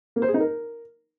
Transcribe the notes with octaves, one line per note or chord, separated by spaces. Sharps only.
A#3
C5
G#4
D#4
A#4